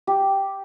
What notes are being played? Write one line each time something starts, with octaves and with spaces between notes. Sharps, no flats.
G4